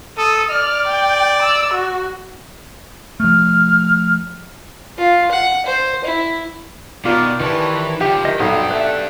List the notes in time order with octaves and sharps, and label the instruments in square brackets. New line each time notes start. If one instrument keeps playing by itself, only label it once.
[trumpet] A4 [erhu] D#6
[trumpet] D5 [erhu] F6
[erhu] G5
E6
F#4
[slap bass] F3 A3 [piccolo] F6
[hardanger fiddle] F4
F#5
C5
E4
[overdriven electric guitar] B2 [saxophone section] D#3 D4 D5 [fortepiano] F4
[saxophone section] F2 G3 B4 [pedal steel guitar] D#3 C#5 A5 [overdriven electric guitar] E3
[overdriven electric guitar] D3 F3 [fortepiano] G4
[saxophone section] C3 D#3 E3 [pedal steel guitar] D#5
[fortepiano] B1 [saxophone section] F2 [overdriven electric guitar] D4 G4 [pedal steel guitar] B4 D#6
[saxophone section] A3 [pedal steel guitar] D5 F#6